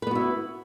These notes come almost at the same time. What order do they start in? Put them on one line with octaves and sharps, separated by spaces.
B4 B3 F#4 E4